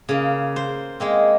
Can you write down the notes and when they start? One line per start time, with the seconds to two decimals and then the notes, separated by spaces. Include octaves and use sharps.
0.09 C#3 A#3
0.56 C5
1.00 G#3 A#3 C4